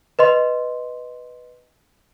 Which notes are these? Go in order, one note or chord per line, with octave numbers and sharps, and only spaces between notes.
B4 D#5 C6